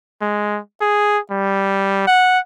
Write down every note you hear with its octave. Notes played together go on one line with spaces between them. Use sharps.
G#3
G#4
G3
F#5